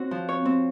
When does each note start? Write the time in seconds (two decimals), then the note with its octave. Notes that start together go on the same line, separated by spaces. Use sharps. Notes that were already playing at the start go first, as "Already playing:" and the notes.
Already playing: C4 F#4 C#5
0.11 F3
0.29 C#5
0.45 C4